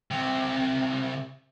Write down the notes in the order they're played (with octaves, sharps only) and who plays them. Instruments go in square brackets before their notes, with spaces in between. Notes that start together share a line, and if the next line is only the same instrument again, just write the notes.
[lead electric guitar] C2 C3